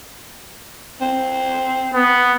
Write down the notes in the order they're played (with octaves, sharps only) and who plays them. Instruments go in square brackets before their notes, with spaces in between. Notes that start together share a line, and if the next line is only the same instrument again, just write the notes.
[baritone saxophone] C4
[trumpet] B3